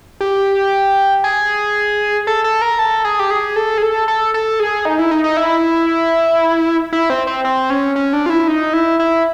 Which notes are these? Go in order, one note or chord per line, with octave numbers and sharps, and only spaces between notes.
G4
G#4
A4
A4
A#4
A4
G#4
G4
G#4
A4
G#4
A4
A4
A4
G#4
D#4
E4
D#4
D#4
E4
E4
C4
C4
C4
C#4
C#4
D4
F4
E4
D#4
E4
E4